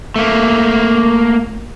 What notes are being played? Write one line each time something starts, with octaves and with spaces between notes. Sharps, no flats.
A3 A#3